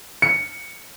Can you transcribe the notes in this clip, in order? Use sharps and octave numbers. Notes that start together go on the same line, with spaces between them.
C#7